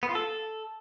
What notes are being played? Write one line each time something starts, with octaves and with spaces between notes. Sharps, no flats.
B3
F4
A4